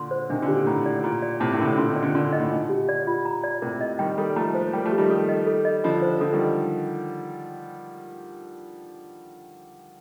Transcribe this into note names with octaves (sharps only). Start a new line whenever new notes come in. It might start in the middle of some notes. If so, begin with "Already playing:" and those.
Already playing: A#2 D3 C6
C5
C3 D#3 D4
A#2 D3
G4
A#2
A2 A#5
D5
A#2 A#5
D5
A2 C3 A5
A2 C3
D3 A#4
A2 C3
A#2 D3 C6
C3 D#3
D5
A#2 D3
A#2 D3 C6
A#2
D#5
A2
A#2 D#4
G4
D5
F4
A#5
D5
A2 C3 A#4
D#5
D#3 G3 G5
G3 A#3 A4
F3 A3 A#5
C5
G3 A#3 G5
F3 A3
G4
D#3 G3
A4
D#5
A4
D#5
D3 F3 F4
C5
D3 F3 A4
D#3 G3